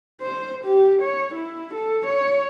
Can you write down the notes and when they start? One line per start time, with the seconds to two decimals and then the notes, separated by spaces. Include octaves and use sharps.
0.21 C5
0.64 G4
1.02 C#5
1.35 E4
1.74 A4
2.06 C#5